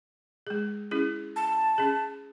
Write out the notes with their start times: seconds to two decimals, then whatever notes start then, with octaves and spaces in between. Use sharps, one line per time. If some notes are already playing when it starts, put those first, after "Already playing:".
0.47 G#3 G#4
0.91 C#4 E4 G#4
1.36 A5
1.78 C#4 G#4